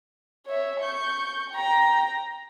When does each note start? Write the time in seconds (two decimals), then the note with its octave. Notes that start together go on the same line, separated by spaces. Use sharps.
0.46 C#5 E5
0.81 C#6 G6
1.51 G5 A#5